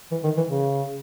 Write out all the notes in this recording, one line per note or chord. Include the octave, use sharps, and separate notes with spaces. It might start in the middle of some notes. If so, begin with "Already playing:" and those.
E3
D#3
E3
C#3